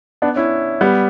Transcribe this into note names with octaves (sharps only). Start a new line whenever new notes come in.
B3 D4
C#4 E4
G3 B3